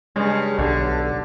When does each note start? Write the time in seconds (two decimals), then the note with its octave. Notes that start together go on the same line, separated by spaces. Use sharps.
0.16 G2 C#3 G#3
0.58 B1 D3